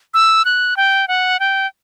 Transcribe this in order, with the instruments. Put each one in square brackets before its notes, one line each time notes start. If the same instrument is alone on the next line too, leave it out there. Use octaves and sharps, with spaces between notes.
[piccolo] E6
F#6
G5
F#5
G5